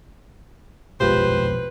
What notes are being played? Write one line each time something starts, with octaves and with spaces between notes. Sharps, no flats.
F1 A#1 B2 G#3 F4 G4 B4 C5